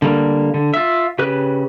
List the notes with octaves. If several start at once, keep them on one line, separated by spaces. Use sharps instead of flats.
D3 G3 A#3
D3
F4 E5
C#3 G4 B4 F#6